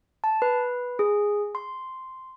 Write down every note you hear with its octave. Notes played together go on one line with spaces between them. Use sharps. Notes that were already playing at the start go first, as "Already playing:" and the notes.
A5
B4
G#4
C6